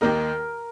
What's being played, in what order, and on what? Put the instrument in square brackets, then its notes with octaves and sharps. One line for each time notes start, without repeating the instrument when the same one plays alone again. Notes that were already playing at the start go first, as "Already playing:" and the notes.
[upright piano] D#2 D#3 A#3 D#4 [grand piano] A#4